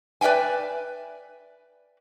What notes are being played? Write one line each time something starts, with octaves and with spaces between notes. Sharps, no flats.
B4 D5 E5 G5 G#5